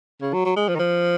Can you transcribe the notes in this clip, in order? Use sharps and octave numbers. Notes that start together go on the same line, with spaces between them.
C#3
F#3
F#3
G#3
F3
D#3
F3